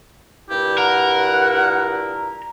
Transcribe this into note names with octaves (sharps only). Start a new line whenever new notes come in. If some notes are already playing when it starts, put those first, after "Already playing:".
G2 A#2 E4 G4
A#4 F#5